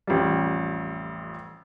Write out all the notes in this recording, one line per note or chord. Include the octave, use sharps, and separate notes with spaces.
A1 F2 G3